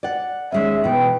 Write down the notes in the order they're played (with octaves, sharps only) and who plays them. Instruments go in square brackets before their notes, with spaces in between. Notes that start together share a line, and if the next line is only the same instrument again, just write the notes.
[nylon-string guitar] D5 F#5
[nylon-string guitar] D#2 G#3 C#4 [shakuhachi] E5
[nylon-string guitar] B2 E3 [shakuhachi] G5